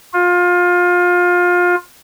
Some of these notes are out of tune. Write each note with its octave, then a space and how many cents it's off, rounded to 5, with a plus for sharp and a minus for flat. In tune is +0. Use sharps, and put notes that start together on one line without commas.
F4 +25